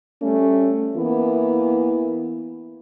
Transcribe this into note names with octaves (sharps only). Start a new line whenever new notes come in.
G3 A3 C#4
E3 A#3 B3 E4